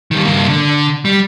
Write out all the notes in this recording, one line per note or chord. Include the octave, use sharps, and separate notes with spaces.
D#3 G3
G2 A#3
D3
G3